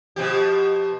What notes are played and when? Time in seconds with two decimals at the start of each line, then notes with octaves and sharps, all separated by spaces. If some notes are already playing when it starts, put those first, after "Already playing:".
0.16 B2 F3 G4